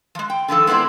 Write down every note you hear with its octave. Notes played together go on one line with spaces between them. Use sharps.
F3 G#3
G5
D3 D#3 F3 A4
G#3 B3 C4 E4 D5